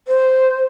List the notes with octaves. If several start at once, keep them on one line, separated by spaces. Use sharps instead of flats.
C5